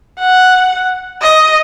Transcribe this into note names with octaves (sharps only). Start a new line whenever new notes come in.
F#5
D#5